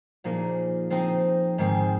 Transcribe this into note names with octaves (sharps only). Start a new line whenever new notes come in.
A#2 F3 A#3 D#4 G#4
F3 C4 D#4
G#2 D#3 G#3 C4